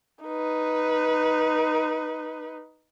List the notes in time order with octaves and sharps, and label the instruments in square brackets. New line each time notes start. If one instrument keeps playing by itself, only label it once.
[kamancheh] D#4 B4